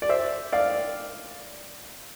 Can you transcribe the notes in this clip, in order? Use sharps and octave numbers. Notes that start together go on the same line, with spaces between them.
D5
C5 E5
D5 F5